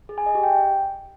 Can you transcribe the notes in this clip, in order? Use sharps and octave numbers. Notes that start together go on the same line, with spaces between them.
G#4
G#5
D#5
G4
G5